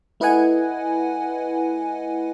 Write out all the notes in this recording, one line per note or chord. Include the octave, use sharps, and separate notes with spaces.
A3 E4 B4 D#5 F#5 G#5